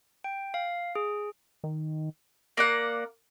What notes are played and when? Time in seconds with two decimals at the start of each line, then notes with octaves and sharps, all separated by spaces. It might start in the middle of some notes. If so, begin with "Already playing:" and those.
0.24 G5
0.54 F5
0.95 G#4
1.64 D#3
2.57 A#3 D5 F#5